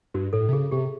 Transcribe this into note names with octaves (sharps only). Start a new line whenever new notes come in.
G2 F#4
A2 A4
C3
C#3 G#4
C3 G4